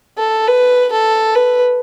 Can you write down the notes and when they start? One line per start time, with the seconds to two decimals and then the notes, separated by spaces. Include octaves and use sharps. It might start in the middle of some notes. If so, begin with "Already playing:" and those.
0.18 A4
0.48 B4
0.92 A4
1.35 B4